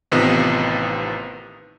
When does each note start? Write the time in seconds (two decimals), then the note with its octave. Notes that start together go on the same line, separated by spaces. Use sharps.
0.12 A1 C3 D#3 B3 F4 D#5